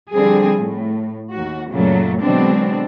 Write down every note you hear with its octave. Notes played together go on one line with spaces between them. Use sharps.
D3 F3 G3 C4 G#4
A2
D#2 F#4
F#2 A#2 C#3 F#3 A3
B2 D3 F#3 G#3 C4 D4